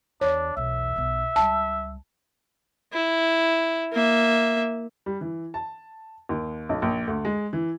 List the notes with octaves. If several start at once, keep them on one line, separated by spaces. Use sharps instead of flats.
E2 D4 C#5
B1 E2 E5
B1 B3
C#2 G3 A5
E4
A#3 E5
G3
E3
A5
D#2
B1
A#1
D2
G#3
E3